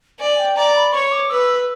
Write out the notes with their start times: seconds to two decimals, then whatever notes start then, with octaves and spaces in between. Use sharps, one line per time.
0.19 D5 G#5
0.38 G5
0.56 D5 A#5
0.75 B5
0.93 C#5 C#6
1.12 D6
1.30 B4 E6